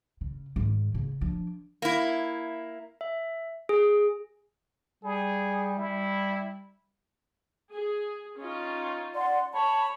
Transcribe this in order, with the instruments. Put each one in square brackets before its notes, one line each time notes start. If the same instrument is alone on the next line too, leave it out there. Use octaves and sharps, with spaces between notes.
[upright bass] C#3
G#2 D#3
C#3
F3 D4
[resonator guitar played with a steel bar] A#3 E4
[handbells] E5
G#4
[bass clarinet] G3 [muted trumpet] G#4
[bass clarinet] G3 [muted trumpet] E4
[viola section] G#4
C#4 D#4 F4
[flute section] D5 F#5 C6
[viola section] C#5 [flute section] A5 B5